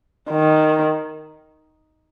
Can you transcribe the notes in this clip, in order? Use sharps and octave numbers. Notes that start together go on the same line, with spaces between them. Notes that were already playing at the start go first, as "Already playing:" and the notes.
D#3